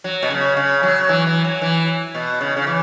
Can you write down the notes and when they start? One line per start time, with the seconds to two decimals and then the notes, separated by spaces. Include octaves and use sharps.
0.04 F#3
0.23 B2
0.30 C#3
0.57 C#3
0.83 F#3
1.09 E3
1.27 E3
1.45 F#3
1.62 E3
2.15 B2
2.41 C#3
2.56 C#3
2.67 E3